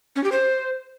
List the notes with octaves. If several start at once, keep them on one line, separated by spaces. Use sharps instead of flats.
C#4
G4
C5